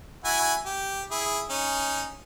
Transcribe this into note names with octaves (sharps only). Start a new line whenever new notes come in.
E4 F#4 G#5
G4
E4 G#4
C#4 D#4